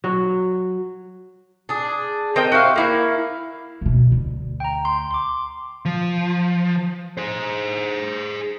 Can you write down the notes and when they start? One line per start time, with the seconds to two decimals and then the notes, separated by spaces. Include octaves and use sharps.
0.04 F#3
1.69 D4 G#4
2.36 C4 A#4 D#5 G5
2.52 F#4 G4 E5 F5
2.76 A#3 E4 F5
3.81 B1 B2
4.12 D2
4.60 G5 A#5
4.85 C6
5.11 C6 D6
5.85 F3
7.17 G#4 C5